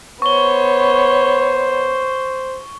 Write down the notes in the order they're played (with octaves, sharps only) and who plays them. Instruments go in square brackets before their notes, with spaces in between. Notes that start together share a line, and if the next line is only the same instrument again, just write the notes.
[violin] B3 C#5 [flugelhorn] C5 [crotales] C#6 G7